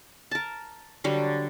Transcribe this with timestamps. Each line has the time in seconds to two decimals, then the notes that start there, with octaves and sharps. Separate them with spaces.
0.31 A#4 A5
1.04 D3 F#3 G3